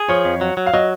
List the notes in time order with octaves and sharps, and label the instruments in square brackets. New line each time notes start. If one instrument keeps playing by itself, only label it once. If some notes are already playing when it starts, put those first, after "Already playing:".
Already playing: [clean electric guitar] G#4
[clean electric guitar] F3 [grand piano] C#5
[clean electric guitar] F2
F#3
F#3
[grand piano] F5
[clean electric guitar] F#3 [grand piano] D#5